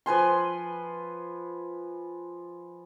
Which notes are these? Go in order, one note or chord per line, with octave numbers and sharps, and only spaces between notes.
F3 B4 G#5 C6